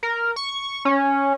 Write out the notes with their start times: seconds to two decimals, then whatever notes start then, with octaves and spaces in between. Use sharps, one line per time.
0.03 A#4
0.36 C#6
0.85 C#4